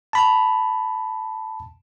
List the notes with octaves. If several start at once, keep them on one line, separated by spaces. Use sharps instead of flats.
A5 B5